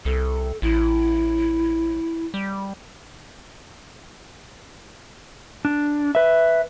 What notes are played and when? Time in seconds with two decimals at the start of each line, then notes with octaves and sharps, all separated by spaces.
0.05 C2 A4
0.62 A1 E4
2.34 G3
5.65 D4
6.15 B4 E5